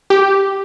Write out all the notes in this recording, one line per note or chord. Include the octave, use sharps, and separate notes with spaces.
G4